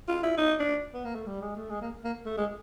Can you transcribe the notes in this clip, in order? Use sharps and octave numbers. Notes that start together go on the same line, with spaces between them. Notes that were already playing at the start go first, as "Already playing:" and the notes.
F4
E4
D#4
D4
B3
A#3
A3
G3
G#3
A3
G#3
A#3
A#3
A3
G#3